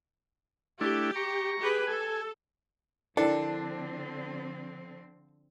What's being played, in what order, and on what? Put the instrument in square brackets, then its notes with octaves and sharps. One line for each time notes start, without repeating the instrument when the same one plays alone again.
[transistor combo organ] A3 D4 E4 [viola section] G4
[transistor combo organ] A#5 C#6
[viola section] G4 G#4 B4
[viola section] A4 [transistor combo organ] G#5
[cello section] D3 F3 C4 [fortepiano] D4 [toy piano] E4 A#4 G5 [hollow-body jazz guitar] A4